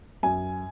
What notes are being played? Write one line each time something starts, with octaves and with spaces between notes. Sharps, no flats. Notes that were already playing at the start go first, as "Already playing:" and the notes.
F#2 G#5